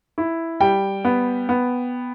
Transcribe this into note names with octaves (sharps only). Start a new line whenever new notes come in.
E4
G3 G5
B3
B3